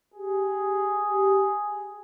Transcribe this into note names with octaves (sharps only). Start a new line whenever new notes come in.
G4 G#4